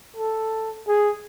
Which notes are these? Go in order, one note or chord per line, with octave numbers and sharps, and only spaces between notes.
A4
G#4